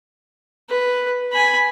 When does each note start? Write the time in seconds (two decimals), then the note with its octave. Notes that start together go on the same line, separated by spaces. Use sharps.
0.69 B4
1.32 G#5 B5